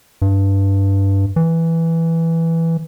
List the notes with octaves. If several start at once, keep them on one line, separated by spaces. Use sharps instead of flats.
G2
E3